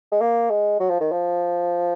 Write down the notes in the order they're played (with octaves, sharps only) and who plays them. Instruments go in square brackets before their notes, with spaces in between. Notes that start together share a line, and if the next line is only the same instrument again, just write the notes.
[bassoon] G#3
A#3
G#3
F#3
F3
D#3
F3